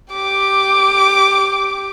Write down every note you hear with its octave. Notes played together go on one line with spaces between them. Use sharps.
G4 D6